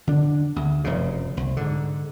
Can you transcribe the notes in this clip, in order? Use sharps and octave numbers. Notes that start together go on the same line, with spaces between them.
D3 D4
D2
F1 F#2 C#3
C2
G#2 D3